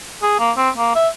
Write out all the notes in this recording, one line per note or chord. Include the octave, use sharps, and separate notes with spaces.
G#4
A#3
C4
A#3
E5